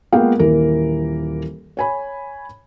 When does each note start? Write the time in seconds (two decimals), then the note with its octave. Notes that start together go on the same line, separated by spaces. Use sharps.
0.12 G#3 A#3 B3 F4 F5 G5
0.39 D#1 E3 A#3 A#4
1.77 C#5 G#5 B5